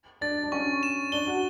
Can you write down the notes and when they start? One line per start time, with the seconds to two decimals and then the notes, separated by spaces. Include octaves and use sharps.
0.21 D4 A6
0.44 D4
0.52 C#4 C#6
0.83 E7
1.12 D4 G7
1.27 F#4